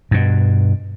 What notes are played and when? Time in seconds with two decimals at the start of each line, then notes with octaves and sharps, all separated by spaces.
0.11 G2 B2